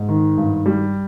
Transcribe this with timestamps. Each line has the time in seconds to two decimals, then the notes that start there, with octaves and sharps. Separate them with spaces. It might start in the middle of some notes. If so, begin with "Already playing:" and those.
Already playing: G#2
0.09 D#3
0.38 G2
0.66 G3